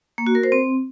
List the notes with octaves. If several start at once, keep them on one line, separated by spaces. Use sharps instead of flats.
A#3
F#4
A#4
C5
C4